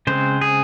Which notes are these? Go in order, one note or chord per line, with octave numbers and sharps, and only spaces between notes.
C#3 G#3 C4 C5
G#4